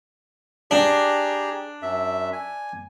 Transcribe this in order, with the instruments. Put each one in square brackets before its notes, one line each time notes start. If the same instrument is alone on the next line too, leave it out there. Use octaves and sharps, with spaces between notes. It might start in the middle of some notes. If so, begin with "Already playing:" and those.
[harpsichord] D4 [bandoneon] G4 G#4 A#5
[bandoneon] F#2 E5
G#5